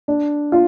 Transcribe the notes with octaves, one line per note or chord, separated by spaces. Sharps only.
D4
F4